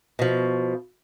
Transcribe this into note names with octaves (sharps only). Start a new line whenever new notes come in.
B2 F3